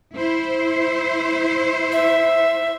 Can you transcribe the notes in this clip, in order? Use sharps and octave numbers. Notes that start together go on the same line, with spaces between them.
E4 C5
E5